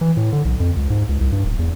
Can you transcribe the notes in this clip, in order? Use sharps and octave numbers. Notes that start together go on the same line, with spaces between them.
E3
A2
D3
B1
F2
C#2
G#2
C#2
C2
G2
D1
E2